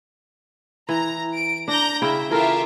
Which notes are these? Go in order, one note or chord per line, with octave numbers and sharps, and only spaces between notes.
E3 A#5
D7
D4 A#5 G6 A#6
C#3 E4 E5 G5
E3 F4 G4 A4 A#4 E5